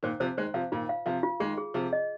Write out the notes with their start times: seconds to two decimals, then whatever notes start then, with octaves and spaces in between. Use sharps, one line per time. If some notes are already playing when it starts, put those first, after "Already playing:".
0.03 A#2 D#3 C5
0.20 C3 F3 C5
0.37 D#3 G#3 C5
0.54 C3 F3 F5
0.72 A#2 D#3 F4
0.89 F5
1.06 C3 F3 F5
1.23 F4
1.40 D#3 G#3 G#4
1.58 G#4
1.74 C3 F3 G#4
1.93 D#5